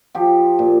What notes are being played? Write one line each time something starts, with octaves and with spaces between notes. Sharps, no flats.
F3 G4
A#2